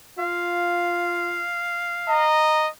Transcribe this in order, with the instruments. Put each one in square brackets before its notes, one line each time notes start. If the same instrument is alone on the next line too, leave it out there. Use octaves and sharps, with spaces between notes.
[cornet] F4 [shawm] F5
[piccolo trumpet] D#5 [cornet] A#5